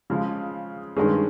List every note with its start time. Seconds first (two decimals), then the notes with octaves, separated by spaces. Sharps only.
0.10 C#3 F3 G#3
0.96 G2 D#3 G#3 C#4 G#4